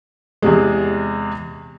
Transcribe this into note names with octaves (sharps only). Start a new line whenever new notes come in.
E2 C3 G#3